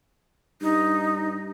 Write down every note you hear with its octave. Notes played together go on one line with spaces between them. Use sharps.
G2 D#4